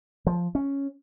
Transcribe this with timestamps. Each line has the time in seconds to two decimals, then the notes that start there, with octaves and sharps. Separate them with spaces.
0.27 F3
0.55 C#4